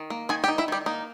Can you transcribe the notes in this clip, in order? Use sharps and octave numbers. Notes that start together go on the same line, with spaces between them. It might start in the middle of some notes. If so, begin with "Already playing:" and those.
Already playing: D#3
A#3
D#3 G#4 G#5
G4 G5
D#4
E4 E5
D#3 G3 G4
A#3 D#4